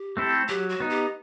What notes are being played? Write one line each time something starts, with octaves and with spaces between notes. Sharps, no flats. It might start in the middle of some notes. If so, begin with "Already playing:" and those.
Already playing: G4
A3 C4 E4 A4
F#3 G4
F#4
B3 D#4
G4